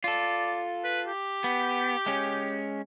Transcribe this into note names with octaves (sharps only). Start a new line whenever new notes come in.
F4 A4 D5
B4
G4
B3
G#3 C#4